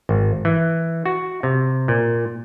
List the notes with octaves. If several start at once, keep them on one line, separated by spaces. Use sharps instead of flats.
G#1
E3
F#4
C3
A#2